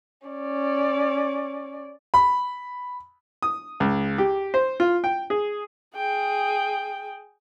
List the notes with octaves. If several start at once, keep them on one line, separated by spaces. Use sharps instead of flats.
C#4 D5
B5
D#6
C#2
G4
C5
F4
G5
G#4
G#4 G5